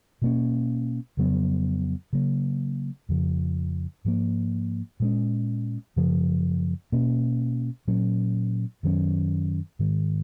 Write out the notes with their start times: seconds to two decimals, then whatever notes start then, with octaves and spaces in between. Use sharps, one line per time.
0.22 B2 A#3 C#4
1.17 F2 C#3 F#3 B3
2.13 C#3 F#3 A#3
3.09 F2 C#3 F3
4.05 G#2 F3 A#3
5.00 A#2 G#3 C#4
5.96 F#2 C#3 F3
6.92 B2 A#3 C#4
7.88 A#2 F#3 C#4
8.83 F#2 D#3 F#3 C#4
9.79 G#2 D#3 G#3